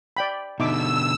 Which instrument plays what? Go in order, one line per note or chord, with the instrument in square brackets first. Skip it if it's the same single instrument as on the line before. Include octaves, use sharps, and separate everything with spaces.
[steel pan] D5 G5 B5
[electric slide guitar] B2 D3 [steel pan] D#4 E5 D6 [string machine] E6